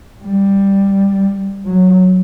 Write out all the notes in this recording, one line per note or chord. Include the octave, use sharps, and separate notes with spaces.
G3
F#3